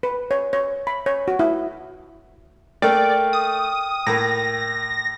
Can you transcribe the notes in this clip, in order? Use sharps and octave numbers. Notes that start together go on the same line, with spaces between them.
B4
C#5
C#5
B5
C#5
F#4
E4
A3 A#3 D5 G5 F6
D#6
A2 A#3 A#6